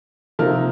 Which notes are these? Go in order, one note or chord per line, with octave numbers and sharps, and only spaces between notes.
C3 F3 A#3 D#4 F6